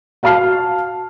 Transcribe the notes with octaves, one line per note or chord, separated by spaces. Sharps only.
F#4 F5 A5 F6 C7